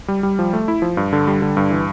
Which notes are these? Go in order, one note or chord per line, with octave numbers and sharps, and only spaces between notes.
G3
G3
F3
A3
E4
F3
G2
D3
G3
D3
G2
E3